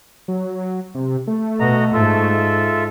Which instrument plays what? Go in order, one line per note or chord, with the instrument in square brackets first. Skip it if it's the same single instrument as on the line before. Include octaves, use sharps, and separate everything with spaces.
[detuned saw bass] F#3
C3
A3
[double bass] B2 [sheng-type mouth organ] F#4 D#5 A#5
[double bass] G#2 [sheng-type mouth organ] F4 A4 E5